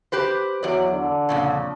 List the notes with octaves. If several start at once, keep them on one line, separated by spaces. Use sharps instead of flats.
G4 B4 C5
E2 F#3 D5
D3
F2 A#2 C#3